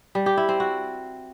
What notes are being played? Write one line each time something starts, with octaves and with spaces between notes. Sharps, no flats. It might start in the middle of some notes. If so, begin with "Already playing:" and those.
G3
G4
E4
C4
F#4